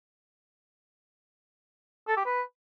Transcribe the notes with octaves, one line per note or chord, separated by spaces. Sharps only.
A4
G4
B4